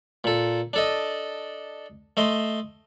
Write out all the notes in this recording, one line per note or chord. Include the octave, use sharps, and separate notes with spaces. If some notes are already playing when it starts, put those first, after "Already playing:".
A#2 A4
D4 A4 D#5
A3 D#5 C6